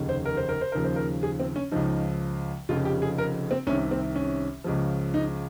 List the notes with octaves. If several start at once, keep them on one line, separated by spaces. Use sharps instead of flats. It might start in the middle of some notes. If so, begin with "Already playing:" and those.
Already playing: F1 D#2 C#3
C5
A#4
C5
A#4
C5
D#2 C#3 F3 A#4
C5
A#4
G#4
C4
C#4
C#2 C#3 F3 D#4
F1 F2 C#3 F3 F4
G4
G#4
A#4
C4
C2 C3 D#3 C#4
C4
C#4
C#2 C#3 F3
D#4